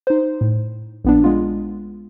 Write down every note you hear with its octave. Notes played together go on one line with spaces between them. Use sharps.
D#4 C5
A2
A#1 B3 D4
G#3 B3 F4